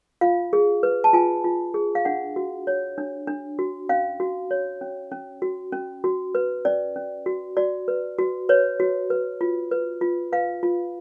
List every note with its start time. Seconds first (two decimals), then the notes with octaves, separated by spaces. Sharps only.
0.21 F4 F5
0.53 G#4
0.83 B4
1.04 A5
1.13 F4 G#5
1.44 F4
1.74 G#4
1.95 F5
2.05 D4 F#5
2.36 F#4
2.67 C#5
2.98 D4
3.27 D4
3.59 F#4
3.89 C#4 F5
4.20 F#4
4.51 C#5
4.81 C#4
5.11 C#4
5.42 F#4
5.72 C#4
6.04 F#4
6.35 B4
6.65 C#4 D5
6.96 C#4
7.26 F#4
7.57 F#4 D5
7.88 B4
8.18 F#4
8.49 B4 C#5
8.80 F#4
9.10 B4
9.41 F4
9.71 B4
10.01 F4
10.32 B4 F5
10.63 F4